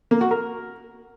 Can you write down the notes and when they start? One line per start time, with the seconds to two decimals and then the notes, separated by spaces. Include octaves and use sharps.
0.11 A#3
0.21 F#4
0.31 A#4